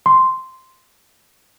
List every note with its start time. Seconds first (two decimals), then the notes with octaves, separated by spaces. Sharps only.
0.06 C6